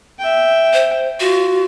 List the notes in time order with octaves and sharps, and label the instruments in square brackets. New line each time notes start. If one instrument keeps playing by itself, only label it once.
[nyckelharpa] E5 G5
[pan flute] C5
[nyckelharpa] F4 [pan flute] F#4